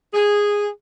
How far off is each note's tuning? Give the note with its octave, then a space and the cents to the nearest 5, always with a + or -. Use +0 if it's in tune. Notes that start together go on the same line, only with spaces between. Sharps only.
G#4 -10